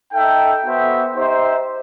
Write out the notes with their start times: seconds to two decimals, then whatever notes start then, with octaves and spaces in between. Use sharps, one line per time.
0.12 D#4 A4 E5 G5
0.64 B3 F#4 C5 E5 G5
1.15 D#4 G4 C5 E5